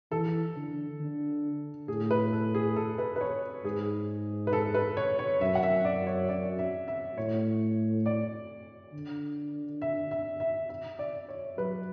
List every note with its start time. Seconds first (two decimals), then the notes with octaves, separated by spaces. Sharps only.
0.12 E3 A4
0.57 D3
1.00 D3
1.88 A2 G#4
2.11 B4
2.32 A4
2.55 G#4
2.76 A4
2.98 B4
3.16 B4
3.21 C#5
3.64 G#2 G#4
4.47 B4
4.53 A4
4.74 B4
4.97 C#5
5.19 C#5
5.41 F#2 E5
5.55 F#5
5.63 E5
5.85 D5
6.07 C#5
6.29 D5
6.59 E5
6.88 E5
7.17 A2 C#5
8.06 D5
8.93 D3
9.82 E5
10.11 E5
10.40 E5
10.69 E5
10.99 D5
11.29 C#5
11.58 F#3 B4